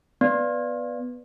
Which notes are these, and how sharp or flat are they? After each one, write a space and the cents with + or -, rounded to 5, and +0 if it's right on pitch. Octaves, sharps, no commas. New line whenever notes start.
B3 +0 D5 +0